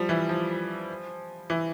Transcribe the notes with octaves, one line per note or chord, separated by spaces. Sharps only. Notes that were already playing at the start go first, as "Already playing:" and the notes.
Already playing: F3 G3
E3
F3
E3